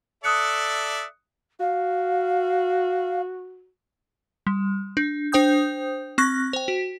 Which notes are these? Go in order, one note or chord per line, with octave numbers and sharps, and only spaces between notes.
A4 D5 E5 D#6 F#6 C#7
F#4 F5
G3
D4
D4 C5 G5 D#6 G6
C4 C#6 F#6 A#6
C5 G5
F#4